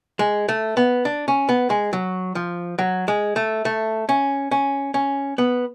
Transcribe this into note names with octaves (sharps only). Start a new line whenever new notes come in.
G#3
A3
B3
D4
C#4
B3
G#3
F#3
F3
F#3
G#3
A3
A3
C#4
C#4
C#4
B3